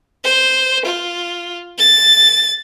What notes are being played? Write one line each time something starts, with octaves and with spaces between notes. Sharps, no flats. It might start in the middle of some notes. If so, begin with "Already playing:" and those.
C5
F4
A6